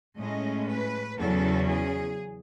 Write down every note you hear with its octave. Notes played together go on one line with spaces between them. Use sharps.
A2 G#3 C#4 D#5
B4
E2 C#3 F#3 C#4 A4
G#4